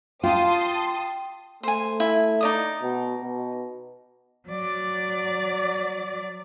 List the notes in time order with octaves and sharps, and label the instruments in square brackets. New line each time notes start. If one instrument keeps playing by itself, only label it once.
[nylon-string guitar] F4 [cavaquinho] G4 F5 G5 [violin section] A5 C6 D#6
[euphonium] A3 [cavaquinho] C5 G#5
[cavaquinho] E4
D#4 D5 D#6
[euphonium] B2
B2
[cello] F#3 D5